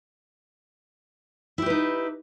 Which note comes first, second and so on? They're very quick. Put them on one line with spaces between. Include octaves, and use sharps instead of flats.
E4 G4 B4 D#4